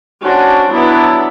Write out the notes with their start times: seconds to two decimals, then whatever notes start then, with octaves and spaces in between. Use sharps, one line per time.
0.23 C#4 D4 F#4 C5
0.71 F#3 B3 D4 E4